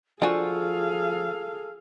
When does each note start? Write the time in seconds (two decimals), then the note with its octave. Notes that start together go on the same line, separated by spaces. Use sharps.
0.22 F3 D4 F4 F#4 G#4 A4 F5 G#5